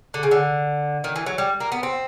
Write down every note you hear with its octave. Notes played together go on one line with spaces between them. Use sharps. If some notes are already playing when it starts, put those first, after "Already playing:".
D3
C#3
D3
D#3
E3
F#3
G3
A#3
B3
C4